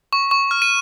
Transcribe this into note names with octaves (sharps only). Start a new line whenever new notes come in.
C#6
C#6
F6
D#7